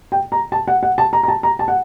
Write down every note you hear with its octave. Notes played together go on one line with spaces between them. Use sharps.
G5
A#5
A5
F#5
F#5
A5
A#5
A#5
A5
A#5
A5
F#5